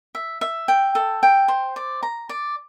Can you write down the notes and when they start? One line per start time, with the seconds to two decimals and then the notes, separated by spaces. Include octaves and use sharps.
0.15 E5
0.41 E5
0.68 G5
0.95 A4
1.23 G5
1.48 C5
1.76 D5
2.03 A#5
2.29 D5